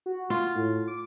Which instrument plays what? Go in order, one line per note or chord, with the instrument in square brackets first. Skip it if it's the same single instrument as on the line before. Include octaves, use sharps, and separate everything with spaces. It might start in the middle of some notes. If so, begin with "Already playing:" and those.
[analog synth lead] F#4
[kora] F4
[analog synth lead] A2
D6